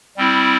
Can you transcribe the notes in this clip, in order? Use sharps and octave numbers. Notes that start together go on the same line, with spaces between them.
G3 C4 E4